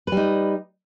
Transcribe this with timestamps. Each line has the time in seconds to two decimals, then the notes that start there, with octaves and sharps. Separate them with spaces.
0.07 B4
0.12 G3
0.17 D#4